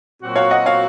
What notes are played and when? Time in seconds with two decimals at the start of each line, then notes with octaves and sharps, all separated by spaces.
0.21 A#2 F#3 C4 F#4
0.35 C#5 F5
0.51 D#5 F#5
0.66 C#5 F5